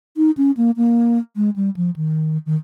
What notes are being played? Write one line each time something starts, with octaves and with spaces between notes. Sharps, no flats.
D#4
C#4
A#3
A#3
G#3
G3
F3
D#3
D#3